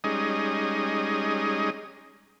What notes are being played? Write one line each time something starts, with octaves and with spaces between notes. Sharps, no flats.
G3 G#3 C#4 D#4 G#4 D#5